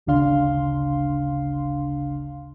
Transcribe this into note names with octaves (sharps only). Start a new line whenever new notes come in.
G#1 D2 C#3 D4 F5 C6